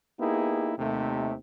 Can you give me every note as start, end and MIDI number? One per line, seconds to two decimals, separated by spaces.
0.20 0.73 58
0.20 0.73 59
0.20 0.73 63
0.20 0.73 64
0.20 0.73 67
0.20 0.73 68
0.78 1.33 39
0.78 1.33 48
0.78 1.33 57